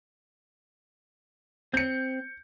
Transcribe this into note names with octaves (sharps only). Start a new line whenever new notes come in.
C4 G6 C#7